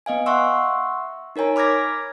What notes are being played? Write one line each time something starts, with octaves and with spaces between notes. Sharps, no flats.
B3 D#5 F5 G#5
E5 F#5 C6 C#6 E6
D#4 A#4 C#5 G#5 A#5
B5 D6 F6 G#6 A#6 B6